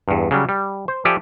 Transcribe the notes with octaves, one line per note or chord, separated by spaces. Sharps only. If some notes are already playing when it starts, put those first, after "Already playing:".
E2 G2
C#3 F#3 G3
G3
C5
F3 G4 A4 D5 E5 G#5